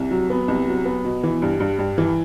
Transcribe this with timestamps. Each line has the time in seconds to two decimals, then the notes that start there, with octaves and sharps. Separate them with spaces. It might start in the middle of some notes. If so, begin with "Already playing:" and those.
Already playing: C2
0.11 F#3
0.30 B3
0.48 C2
0.67 F#3
0.85 B3
1.05 B2
1.23 E3
1.42 G2
1.60 G2
1.79 G2
1.98 E3